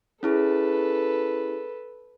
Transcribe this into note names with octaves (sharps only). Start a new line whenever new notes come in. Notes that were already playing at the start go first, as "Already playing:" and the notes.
C#4 E4 G#4 A4 B4